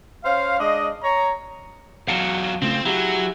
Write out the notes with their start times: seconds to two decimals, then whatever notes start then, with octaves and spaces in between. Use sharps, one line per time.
0.23 C#4 C5 F5
0.60 G#3 D4 D#5
1.03 C#5 A#5
2.08 E2 F#3 F5 F#5 A5
2.62 C#3 A3 C4 F4
2.85 F#3 E4 G4 G#4